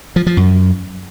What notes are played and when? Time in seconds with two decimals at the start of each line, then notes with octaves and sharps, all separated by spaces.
0.16 F3
0.27 F3
0.37 F#2